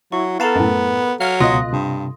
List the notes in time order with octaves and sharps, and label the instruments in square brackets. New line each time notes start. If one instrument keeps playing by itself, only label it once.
[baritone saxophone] F#3 [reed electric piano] E4 [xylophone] C#6
[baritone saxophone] B3 [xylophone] A4 A#5 A6 [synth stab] F5 A5
[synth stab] F#2 A2 [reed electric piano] A#4
[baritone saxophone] F#3 [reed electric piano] F5 [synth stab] F6
[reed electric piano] C#2 B2 F#6 [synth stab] F4 D#5 [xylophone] C6 D#6 A#6
[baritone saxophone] G2 [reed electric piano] C3